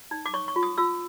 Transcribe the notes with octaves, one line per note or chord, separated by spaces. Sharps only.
D#4
D6
C#5 C#6
C#6
F4
D#6
F4 E6